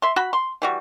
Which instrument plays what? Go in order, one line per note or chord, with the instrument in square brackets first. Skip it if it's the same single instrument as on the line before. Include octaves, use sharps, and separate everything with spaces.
[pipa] E5 C6
F#4 B5
C6
E3 G3 F#4